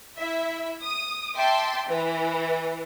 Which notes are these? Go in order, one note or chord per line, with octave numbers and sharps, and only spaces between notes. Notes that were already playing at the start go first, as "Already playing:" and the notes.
E4 E5
D#6
E5 G5 A5 C6 D6
E3